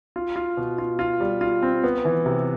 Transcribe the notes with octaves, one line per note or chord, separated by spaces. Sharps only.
F4
F4
B2
F4
F4
G3
F4
C4
B3
E3
C3